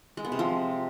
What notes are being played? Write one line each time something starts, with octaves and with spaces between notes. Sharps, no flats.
G#3
B3
C3
F3